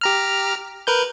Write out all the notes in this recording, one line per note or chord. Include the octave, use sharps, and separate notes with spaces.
G4 A#5 F6
A#4 B4 G6